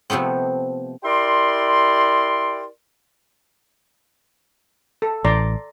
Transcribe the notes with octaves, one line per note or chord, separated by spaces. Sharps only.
C3 F3 A3 B3 C4
E4 G4 A#4 D5 C6
A4
A1 D5 A#5 C6